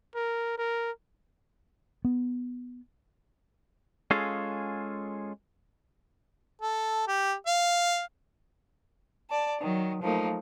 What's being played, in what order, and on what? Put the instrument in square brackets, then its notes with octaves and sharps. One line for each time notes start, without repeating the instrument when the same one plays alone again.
[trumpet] A#4
A#4
[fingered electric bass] B3
[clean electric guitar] G#3 C#4 F4 G#4 A4 F5
[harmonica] A4
G4
F5
[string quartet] D5 A5
D#3 F#3
F3 F#3 A3 A#3 D#4